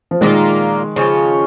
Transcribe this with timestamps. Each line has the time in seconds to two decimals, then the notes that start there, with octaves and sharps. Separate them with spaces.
0.11 F3
0.21 A#2 D#3 G#3 A#3 F4
0.96 C#3 F3 C#4 F4